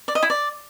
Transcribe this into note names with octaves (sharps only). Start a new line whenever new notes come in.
D5
D#5
E4
D5